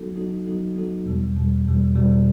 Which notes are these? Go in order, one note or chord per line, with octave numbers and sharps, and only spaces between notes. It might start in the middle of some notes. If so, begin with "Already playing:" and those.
Already playing: F#3 B3 D#4 F#4 A4
F#3 B3 D#4 F#4 A4
F#3 B3 D#4 F#4 A4
F#3 B3 D#4 F#4 A4
E2 B2 G3
E2 B2 G3
E2 B2 G3
E2 B2 G3